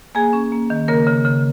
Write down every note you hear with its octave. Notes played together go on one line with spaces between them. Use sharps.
A#3 G#4 G#5
C#4
A#3
D#3
C#3 A#3 A#4
C#3
C#3